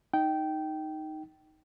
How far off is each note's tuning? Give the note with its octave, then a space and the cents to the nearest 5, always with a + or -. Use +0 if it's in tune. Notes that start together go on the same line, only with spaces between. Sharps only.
D#4 +0 G5 -15